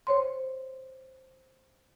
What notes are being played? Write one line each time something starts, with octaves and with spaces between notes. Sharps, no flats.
C5 C#5 C6